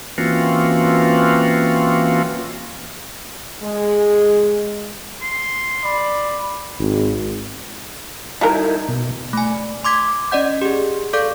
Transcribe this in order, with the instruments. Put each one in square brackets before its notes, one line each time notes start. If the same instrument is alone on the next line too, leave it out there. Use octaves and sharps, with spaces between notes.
[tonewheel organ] E3 A#3 C4 C#4 F4 F#4
[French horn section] G#3
[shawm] C6
[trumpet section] D5 B5
[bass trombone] G#1
[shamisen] G3 F#4 A#4 [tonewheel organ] D#4 E4
[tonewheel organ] B2
[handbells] A3 G#5
C6 D6 G#6 B6
C#4 D5 D#5 F#5 G6
G4 G#4
A4 D5 F5 C#6 D6 G6